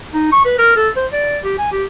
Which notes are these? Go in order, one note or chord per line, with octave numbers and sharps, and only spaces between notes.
D#4
C#6
B4
A#4
A4
C5
D5
G4
G#5
G4